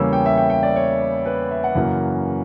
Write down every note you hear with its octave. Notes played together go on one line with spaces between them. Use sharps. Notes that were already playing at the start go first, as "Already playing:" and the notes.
Already playing: E2 C#3 G3 A#3 C#4 E6
G5
E5
G5
G5
D5
C#5
B4
E5
F#5
F#2 C#3 E3 A#3